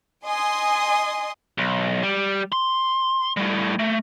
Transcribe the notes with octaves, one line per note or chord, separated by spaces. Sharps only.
D#5 G#5 C6 D#6
B1
G3
C6
A2 G3
A3